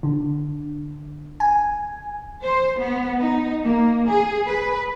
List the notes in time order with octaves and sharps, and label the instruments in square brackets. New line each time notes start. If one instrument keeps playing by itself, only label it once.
[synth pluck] D3
G#5
[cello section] C5
B3
D#4
A#3
G#4
B4